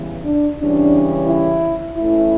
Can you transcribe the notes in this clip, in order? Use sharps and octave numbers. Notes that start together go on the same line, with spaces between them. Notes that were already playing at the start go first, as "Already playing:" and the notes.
Already playing: C#3 E3 G3 B3
D4
C#3 E3 G3 C#4 D4
E4
E3 A3 C#4 E4